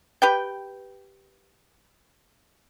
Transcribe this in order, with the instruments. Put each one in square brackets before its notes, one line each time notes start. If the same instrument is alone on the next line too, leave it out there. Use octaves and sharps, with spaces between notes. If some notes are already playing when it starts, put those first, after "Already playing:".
[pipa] G4 B4 G5